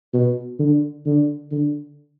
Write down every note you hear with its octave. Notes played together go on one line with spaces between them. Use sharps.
B2
D3
D3
D3